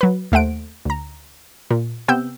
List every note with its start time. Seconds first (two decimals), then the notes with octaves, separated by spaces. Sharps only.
0.01 F#3 B4
0.32 D#2 A3 C5 F#5 D7
0.85 D2 A#5
1.70 A#2
2.08 C3 B3 G5 E6 G6